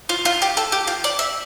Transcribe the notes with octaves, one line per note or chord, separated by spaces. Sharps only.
F4
F4
G4
A4
G4
F4
D5
E5